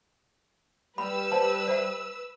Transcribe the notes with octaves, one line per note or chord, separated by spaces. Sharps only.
G3 B4 B5 E6
C5 A5
C5 E5